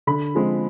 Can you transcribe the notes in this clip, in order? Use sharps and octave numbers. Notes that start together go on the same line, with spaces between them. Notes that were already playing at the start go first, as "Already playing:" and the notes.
D3 B5
F3 G#3 C4